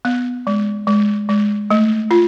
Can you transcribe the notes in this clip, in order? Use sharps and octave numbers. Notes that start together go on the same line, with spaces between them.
B3
G#3
G#3
G#3
A3
F4